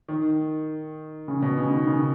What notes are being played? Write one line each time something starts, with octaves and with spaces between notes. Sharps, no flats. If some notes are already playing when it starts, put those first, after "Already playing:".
D#3
C#3
B2
C#3
D#3
C#3